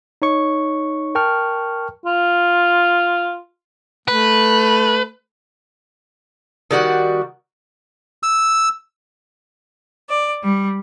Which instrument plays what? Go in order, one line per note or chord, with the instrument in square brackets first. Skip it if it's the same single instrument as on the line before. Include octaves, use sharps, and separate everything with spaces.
[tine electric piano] D#4 C#5 C#6
A#4 G5 A5 C#6 F6
[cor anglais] F4
[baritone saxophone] A3 [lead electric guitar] B4
[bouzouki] D#3 G3 F#4 F#5
[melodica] E6
[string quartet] D5
G3